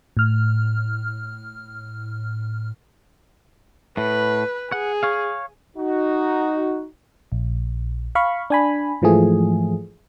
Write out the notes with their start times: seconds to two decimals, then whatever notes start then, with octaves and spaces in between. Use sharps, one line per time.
0.17 A2 F6
3.97 A2 B4
4.72 G#4 F#5
5.03 C#5 F5
5.77 D#4 F#4
7.32 A#1
8.15 F5 B5 C#6
8.50 D4 G#5 B5
9.02 G#2 E3 F3 A3 G#4